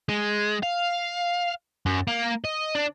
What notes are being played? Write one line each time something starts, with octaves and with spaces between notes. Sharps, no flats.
G#3
F5
F#2
A#3
D#5
D4